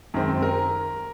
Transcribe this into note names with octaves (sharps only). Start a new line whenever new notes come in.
F#2 D#3 G#3 C4
A#4